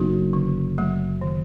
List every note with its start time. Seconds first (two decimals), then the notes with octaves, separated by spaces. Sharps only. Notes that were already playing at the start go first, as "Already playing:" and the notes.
Already playing: F#1 F#2 B3 D#4 F#4
0.33 D3
0.78 F#3 A3
1.21 D#3